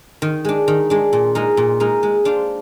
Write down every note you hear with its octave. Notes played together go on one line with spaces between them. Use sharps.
D#3
G#3 D4
D#3
G#3 D4
A#2
G#3 D#4 A#4
A#2
G#3 D#4 A#4
G#3
D4 F4 C5